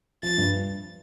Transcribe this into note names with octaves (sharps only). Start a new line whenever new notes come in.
F3 A6
G2